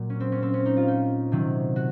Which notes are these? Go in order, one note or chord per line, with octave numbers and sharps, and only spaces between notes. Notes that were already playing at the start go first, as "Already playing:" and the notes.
Already playing: A#2 F#3
C#4
C4
C#4
C4
C#4
D#4
F4
D#4
C3 D#3 F#3
F#4